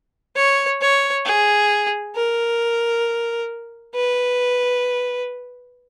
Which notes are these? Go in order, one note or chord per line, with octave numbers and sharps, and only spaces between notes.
C#5
C#5
G#4
A#4
B4